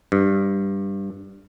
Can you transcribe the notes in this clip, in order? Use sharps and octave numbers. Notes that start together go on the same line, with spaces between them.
G2